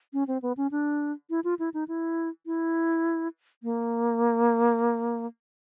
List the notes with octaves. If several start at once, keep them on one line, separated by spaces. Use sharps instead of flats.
C#4
C4
B3
C#4
D4
E4
F4
E4
D#4
E4
E4
A#3